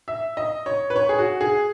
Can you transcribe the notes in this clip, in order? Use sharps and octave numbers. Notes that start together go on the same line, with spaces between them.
E5
D#5
C#5
B4
C#5
G#4
F#4
G#4